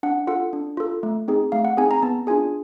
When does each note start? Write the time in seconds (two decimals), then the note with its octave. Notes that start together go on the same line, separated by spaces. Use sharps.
0.03 D4 F#5
0.27 F4 A4 F#5
0.53 D4
0.77 F4 A4
1.03 A3
1.28 C4 D#4 G#4
1.52 A3 F5
1.65 F#5
1.77 C4 D#4 G#4 G#5
1.91 A#5
2.03 B3 A5
2.27 D4 F4 G#4 G#5